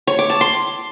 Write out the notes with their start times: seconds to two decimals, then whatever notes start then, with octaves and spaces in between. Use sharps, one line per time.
0.07 C#5
0.19 D6
0.30 A5
0.41 C6